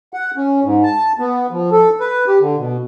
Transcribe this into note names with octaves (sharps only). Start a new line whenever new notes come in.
F#5
C#4
G#2
A5
B3
F3
A4
B4
G4
D3
B2